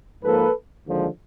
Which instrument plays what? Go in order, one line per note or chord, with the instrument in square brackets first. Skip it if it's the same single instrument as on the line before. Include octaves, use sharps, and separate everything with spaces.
[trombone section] G#2 F3 A#3 A4 B4
D#2 D3 F3 G#3